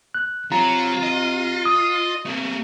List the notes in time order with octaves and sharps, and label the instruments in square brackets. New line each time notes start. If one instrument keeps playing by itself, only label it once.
[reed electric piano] F#6
[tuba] C3 [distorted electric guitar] F#3 [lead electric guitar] F4 [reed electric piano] A#5
[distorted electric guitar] D#5
[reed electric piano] D#6
[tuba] C3 [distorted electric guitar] A3 A#3